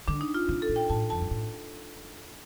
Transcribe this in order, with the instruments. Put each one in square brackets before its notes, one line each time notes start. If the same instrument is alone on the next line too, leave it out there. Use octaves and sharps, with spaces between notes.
[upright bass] D3 [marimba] D4
[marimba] D#4
F4
[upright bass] C3
[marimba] A4
[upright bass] A#2
[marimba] G5
[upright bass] A2 [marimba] A5
[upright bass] F2 [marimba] A5
[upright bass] G2
A2